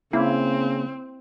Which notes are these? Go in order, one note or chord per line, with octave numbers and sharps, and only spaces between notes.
C#3 A#3 C4 E4